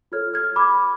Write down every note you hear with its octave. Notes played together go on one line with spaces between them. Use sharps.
F4 A4 C#5 F6 G#6
F6 G#6
B5 D6